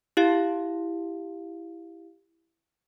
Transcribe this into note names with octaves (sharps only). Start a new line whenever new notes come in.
E4 G4 F5